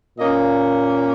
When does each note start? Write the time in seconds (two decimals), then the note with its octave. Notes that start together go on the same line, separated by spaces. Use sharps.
0.18 A#2 A#3 C#4 D#5